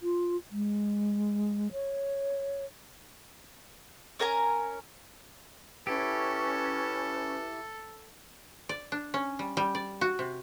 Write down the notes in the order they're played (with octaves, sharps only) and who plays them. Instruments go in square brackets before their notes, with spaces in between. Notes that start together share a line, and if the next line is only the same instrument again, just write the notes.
[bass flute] F4
G#3
C#5
[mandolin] C#4 A#4 G#5 A#5
[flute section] C#4 [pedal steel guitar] E4 G4 [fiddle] A4 [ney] B4
[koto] D5
D4
C#4
G3
G3
D5
F#4
C3